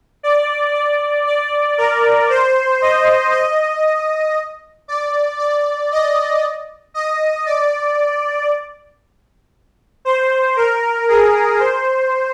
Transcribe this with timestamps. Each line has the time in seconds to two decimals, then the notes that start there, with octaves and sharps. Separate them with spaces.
0.23 D5
0.75 D5
1.27 D5
1.78 A#4
2.29 C5
2.82 D#5
3.33 D#5
4.88 D5
5.39 D5
5.92 D#5
6.94 D#5
7.46 D5
10.05 C5
10.56 A#4
11.09 G#4
11.60 C5